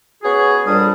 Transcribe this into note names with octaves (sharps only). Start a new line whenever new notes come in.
B3 C#4 F#4 G#4
F2 A#2 G3 D4 D#6